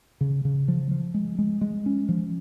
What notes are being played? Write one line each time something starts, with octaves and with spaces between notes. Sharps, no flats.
C#3
C#3
F3
F3
G#3
G#3
G#3
C#4
F3